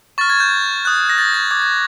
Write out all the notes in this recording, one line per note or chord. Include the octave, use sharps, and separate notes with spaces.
C#6 F6 A6
G#6
G6
D#6 F#6
A#6
A6
G#6
D6 G6 G#6
G#6